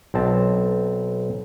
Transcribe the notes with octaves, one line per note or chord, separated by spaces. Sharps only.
B1 C4 A5